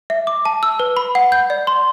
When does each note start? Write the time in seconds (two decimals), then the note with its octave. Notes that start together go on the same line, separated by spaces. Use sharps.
0.10 E5
0.27 D6
0.45 A5
0.63 E6
0.80 B4
0.97 B5
1.15 F#5
1.32 G6
1.50 D5
1.67 C6